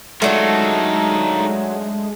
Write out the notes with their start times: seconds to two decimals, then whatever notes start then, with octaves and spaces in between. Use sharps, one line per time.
0.22 F#3 G#3 A3 D4 D#4 F4 A4